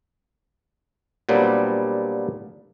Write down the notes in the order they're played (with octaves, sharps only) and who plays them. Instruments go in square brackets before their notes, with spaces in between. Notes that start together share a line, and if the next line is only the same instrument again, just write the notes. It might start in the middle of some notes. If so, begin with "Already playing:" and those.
[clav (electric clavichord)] A#2 F#3 G3 B3 C4 D4